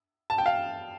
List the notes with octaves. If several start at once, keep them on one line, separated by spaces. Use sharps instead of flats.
A5
G5
F5